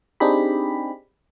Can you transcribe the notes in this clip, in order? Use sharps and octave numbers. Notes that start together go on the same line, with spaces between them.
C4 D4 D#4 G4 G#4 B5